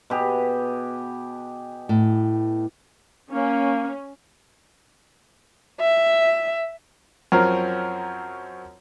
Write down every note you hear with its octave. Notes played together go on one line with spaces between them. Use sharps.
B2 G4 G#4
A2
A#3 C#4
E5
F#2 F3 C4 C#4 A#4